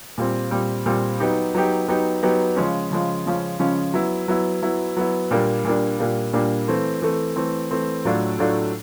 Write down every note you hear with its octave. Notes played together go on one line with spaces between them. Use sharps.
A#2 G3 C4
A#2 G3 C4
A#2 G3 C4
F#3 B3 D#4 G4
F#3 B3 D#4 G4
F#3 B3 D#4 G4
F#3 B3 D#4 G4
C#3 F3 G#3 C#4
C#3 F3 G#3 C#4
C#3 F3 G#3 C#4
C#3 F3 G#3 C#4
F#3 B3 E4
F#3 B3 E4
F#3 B3 E4
F#3 B3 E4
A#2 G3 A#3 D4
A#2 G3 A#3 D4
A#2 G3 A#3 D4
A#2 G3 A#3 D4
E3 A3 C4
E3 A3 C4
E3 A3 C4
E3 A3 C4
A2 F#3 A3 D4 F4
A2 F#3 A3 D4 F4